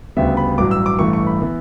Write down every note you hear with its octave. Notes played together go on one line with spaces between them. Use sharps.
D2 C#3 G3 B3 E5
B5
A1 G2 F#3 D6
E6
D6
A1 G2 E3 A3 C#6
C#6
B5
E3 B3